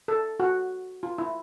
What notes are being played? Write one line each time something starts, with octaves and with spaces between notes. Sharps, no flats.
A4
F#4
F4
E4